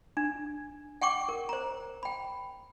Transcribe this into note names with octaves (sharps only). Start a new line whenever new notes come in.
D4
F#5 G5 C#6 D6
A#4
C5 A#5
G5 B5